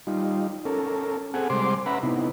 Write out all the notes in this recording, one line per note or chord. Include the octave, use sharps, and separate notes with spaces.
G3 D#4 F4
C#4 A4 A#4
C4 G#4 A4 F#5 G#5
C3 G3 G#3 C5 C6 D6
C#4 B4 E5 F#5 A#5 B5
C3 B3 D#4 E4